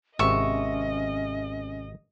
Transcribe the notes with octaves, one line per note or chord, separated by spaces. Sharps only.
G#1 C3 C#4 D#5 E5 C#6